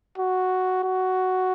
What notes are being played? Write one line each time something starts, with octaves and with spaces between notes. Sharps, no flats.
F#4
F#4